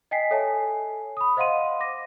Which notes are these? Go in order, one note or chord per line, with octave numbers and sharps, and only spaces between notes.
D#5 G5 G#5 B6 C7
A4 C#5 E5 G#5 A5
B5 D#6
C5 D#5 F5 F#5 C6 D#7
D6 A#6